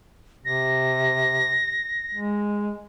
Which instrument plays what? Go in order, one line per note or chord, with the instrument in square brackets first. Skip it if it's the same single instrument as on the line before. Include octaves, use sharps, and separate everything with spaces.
[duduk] C3 [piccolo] A#6
[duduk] G#3